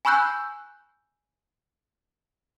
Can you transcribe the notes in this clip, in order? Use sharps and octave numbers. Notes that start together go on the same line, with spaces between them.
G#5 B5 C#6 E6 F#6 G6